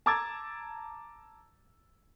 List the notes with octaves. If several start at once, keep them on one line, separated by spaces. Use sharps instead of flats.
A5 A#5 D6 E6 G#6 A6